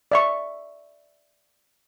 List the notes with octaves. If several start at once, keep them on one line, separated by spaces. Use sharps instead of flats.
D5 E5 C#6